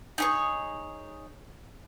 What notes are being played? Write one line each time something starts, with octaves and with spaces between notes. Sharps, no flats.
D#4 G#4 C#5